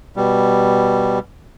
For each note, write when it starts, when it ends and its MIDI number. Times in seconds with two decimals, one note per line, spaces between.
0.17 1.19 47
0.17 1.19 55